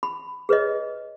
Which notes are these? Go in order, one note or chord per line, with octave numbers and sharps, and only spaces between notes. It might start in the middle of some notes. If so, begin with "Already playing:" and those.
B5
G#4 B4 C#5 D#5